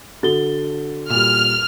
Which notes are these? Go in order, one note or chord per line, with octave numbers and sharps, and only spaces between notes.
D3 F#4 A4 A6 G7
A#2 G3 F6